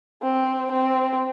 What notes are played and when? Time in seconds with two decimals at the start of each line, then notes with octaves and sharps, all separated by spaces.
0.22 C4
0.71 C4